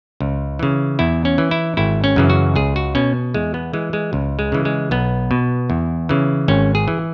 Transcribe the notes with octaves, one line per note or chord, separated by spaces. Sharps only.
C#2
C#3 E3
E2 E4
C#4
E3
E4
G#1 E4
C#4
F#2 C#3 E3
F#4
C#2 G#4
F#4
B2 C#4
E2 G#3
B3
E3 G#3
G#3
C#2
G#3
C#3 E3
G#3
B1 B3
B2
E2
C#3 E3
G#1 C#4
G#4
E3